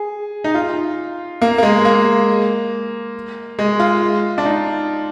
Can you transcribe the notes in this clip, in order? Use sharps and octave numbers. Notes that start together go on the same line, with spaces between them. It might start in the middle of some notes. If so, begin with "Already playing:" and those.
Already playing: G#4
D#4
F4
A#3
A#3
G#3
A#3
G#3
F4
D4
D#4